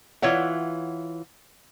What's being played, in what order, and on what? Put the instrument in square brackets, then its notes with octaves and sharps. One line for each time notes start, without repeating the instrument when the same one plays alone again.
[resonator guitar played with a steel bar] E3 F4 C#5 E5 F#5